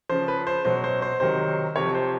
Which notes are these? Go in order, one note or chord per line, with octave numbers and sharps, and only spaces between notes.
C#3 F3 C5
B4
C5
B2 F#3 C5
C5
C5
C3 D#3 F#3 C5
C3 F3 C#5
C5